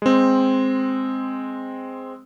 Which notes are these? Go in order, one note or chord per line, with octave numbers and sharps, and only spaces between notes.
G#3 C4